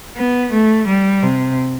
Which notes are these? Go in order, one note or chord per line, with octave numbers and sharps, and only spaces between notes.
B3
A3
G3
C3